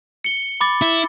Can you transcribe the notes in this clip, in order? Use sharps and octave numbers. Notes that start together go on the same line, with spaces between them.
C#7 G7
B5 D6 A6
E4